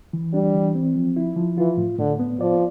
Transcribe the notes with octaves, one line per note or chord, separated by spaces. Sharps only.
E3
G3 D4
E3
C4
F3
E4
F3
E3 F4
A2
A2 D3
B3
F3 D5